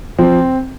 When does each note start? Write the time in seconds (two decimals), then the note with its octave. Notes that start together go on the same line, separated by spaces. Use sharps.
0.18 F3 C4